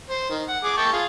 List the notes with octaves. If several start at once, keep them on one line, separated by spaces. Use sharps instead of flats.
C5
D#3
F#5
G#4 D6
G5 A5 C#6
F4 G#4